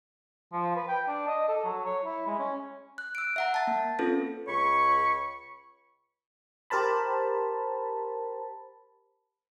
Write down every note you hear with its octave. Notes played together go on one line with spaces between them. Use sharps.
F3
B4
G5
D4
D#5
A4
F#3
C#5
E4
G#3
C#4
F#6
E6 D7
E5 F#5 A#5
A5 A6
A#3
C4 C#4 F4 A4 B4
C#2 C#5 B5 C#6
G4 A#4 C5 A5 B5